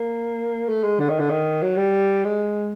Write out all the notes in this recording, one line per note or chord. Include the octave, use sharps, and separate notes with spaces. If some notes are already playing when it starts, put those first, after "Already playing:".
Already playing: A#3
A3
G#3
D3
D#3
D3
D#3
F#3
G3
G#3